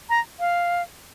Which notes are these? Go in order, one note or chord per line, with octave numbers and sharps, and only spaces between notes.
A#5
F5